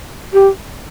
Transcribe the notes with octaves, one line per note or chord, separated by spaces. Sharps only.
G4